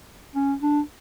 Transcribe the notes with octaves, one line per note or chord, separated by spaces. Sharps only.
C#4
D4